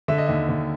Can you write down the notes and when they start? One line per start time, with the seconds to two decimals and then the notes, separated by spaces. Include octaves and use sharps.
0.08 D3 E5
0.18 D#5
0.27 D#2 E5
0.49 D#2